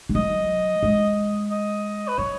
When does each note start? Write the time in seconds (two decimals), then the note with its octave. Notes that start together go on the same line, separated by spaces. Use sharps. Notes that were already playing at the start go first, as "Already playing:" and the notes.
0.09 G#3
0.15 F#3 D#5
0.83 G#3
1.50 D#5
2.08 B4
2.18 F#3 C#5